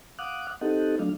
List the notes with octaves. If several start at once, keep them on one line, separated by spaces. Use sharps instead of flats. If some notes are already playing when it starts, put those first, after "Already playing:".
F5 F#5 D6 D#6 F#6
C4 D#4 G4 A4 D#5 F#5
F#3 A3 D4 F5